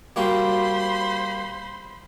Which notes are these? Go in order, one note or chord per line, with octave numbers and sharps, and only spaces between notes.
G3 A#3 F#4 C5 B5 C6